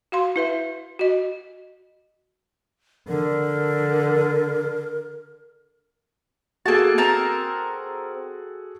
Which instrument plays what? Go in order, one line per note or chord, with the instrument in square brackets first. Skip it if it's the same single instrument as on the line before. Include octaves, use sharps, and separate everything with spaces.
[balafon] F#4 F5 C6
E4 B4 E5
F#4 D#5
[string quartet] D3 [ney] A#4
[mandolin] A#3 A5 [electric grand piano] F#4 G#4 A4
[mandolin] C4 A#4 A5